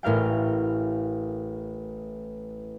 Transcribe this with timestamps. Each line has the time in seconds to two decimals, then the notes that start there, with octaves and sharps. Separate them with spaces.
0.03 A1 A2 A#4 F5 G5